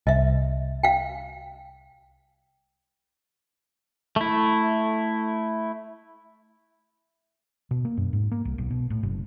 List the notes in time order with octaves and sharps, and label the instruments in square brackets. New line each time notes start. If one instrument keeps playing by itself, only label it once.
[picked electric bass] C2 [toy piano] D#5 E5
[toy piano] F5 G5
[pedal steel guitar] A3 E4
[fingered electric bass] B2
A#3
F#2
G#2
A#3
C2
B1
B2
A2
F#1